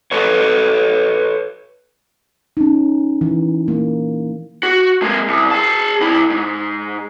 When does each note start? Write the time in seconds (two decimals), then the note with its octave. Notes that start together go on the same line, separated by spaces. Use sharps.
0.12 A4 B4 C#5
2.57 C#4 D#4
3.21 E3
3.68 A#3
4.63 F#4
5.02 G#3 A#3
5.28 C2
5.51 G#4 A5
6.01 C2 E4
6.30 G#2